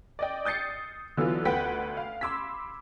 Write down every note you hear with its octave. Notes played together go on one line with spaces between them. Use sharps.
D5 D#5 G5
D#6 G6 A6 C7 C#7
D3 E3 F#3 B3 F4
D2 B4 F#5 G5 B6
F5
B5 C6 D6 E6 G#6 B6